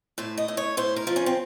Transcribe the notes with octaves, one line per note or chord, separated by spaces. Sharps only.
A2 C5
D#5
A2
C#5
A2 C5
A#4
F3
C#4
C4